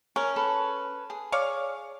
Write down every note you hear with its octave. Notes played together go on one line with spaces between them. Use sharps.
C#4 A#4
A4 B4
G#4
C#5 D5 F5